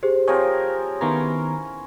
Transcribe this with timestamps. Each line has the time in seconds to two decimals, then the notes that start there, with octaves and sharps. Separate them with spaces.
0.03 G4 G#4 C5
0.28 F3 C4 A#4 C#5 G#5
1.01 D#3 B3 C#4 E4 A#5 C6